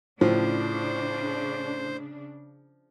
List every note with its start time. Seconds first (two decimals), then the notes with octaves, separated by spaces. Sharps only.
0.21 A2 C#3 F3 D4 C5